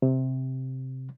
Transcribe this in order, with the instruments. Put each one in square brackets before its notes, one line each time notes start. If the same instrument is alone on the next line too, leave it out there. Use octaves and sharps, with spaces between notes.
[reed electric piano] C3